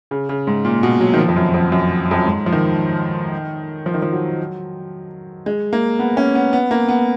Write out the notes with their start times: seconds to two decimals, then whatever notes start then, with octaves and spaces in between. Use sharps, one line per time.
0.11 C#3
0.29 C#3
0.47 G#2
0.65 A#2
0.83 B2
1.01 F#3
1.14 D#3
1.18 F3
1.29 F2
1.36 F#2
1.54 F2
1.72 F#2
2.11 F2
2.18 F#2
2.26 G#2
2.46 F3
2.52 D#3
3.86 F3
3.94 D#3
4.02 F3
4.12 F#3
5.46 G#3
5.73 A#3
5.99 B3
6.17 C#4
6.35 B3
6.53 B3
6.71 A#3
6.89 B3